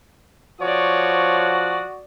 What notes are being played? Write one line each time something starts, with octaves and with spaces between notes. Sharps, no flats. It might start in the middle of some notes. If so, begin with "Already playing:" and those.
F3 F#4 C#5 D5 D#6